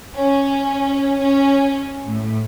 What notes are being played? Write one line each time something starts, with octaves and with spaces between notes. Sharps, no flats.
C#4
C#4
A2